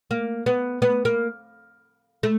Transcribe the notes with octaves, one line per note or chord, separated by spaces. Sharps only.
A#3
B3
B3
A#3
A3